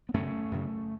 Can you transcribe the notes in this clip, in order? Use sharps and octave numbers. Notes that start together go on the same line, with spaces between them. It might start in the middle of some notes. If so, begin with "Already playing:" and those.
B3
F#2 C#3 A3 C#4
F#2 C#3